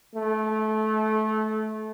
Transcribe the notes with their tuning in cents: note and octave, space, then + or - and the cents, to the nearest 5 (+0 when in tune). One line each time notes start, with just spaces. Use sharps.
A3 -25